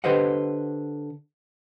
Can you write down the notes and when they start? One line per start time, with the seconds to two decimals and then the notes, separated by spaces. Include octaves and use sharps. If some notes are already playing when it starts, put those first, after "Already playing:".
0.04 D3 G4 B4 C5 D#5 F#5